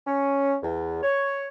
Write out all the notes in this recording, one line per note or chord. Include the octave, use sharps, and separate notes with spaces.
C#4
E2
C#5